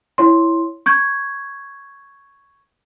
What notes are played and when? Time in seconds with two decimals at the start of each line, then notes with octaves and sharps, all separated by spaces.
0.18 E4 C#5 C6
0.86 C#6 G6 G#6